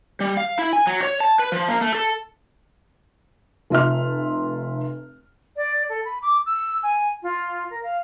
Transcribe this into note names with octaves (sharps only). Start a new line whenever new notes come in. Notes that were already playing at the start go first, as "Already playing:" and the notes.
G3
F5
E4
G#5
F#3
C#5
A5
B4
F3
A#3
A3
A4
F1 F4 E5 F6
D5
A4
B5
D6
E6
G#5
F4
A#4
F5